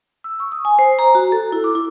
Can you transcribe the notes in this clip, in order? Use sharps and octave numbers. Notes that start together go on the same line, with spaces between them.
E6
C#6
D#6
G#5
C5
A#5
F#4
A4
E4
D6
E4